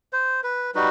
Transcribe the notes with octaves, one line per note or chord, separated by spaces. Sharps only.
C5
B4
G3 D#4 F#4 B4